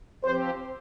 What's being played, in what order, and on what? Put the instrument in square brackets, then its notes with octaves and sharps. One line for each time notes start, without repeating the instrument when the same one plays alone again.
[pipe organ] F3 C4 G4 [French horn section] C5